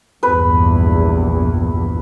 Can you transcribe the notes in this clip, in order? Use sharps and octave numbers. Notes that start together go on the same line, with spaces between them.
A#1 E2 G2 B4